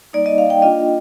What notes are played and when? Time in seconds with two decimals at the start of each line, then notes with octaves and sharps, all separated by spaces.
0.13 G3 A#3 D#4 D5
0.26 D#5
0.38 F5
0.50 G5
0.62 A#3 D4 F4 D#5